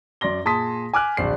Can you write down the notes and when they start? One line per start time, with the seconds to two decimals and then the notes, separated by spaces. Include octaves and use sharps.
0.21 F#2 D5 C6 A#6 G7
0.45 A#2 G#4 A5 C6 D#6 B6
0.93 G#5 D6 F6 F#6
1.17 D1 A#1 D5 C7